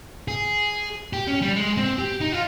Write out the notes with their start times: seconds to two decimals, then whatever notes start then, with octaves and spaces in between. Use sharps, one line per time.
0.28 G#4
1.13 G4
1.28 C#4
1.42 G3
1.56 G#3
1.77 C4
1.99 G4
2.21 D#4
2.32 F4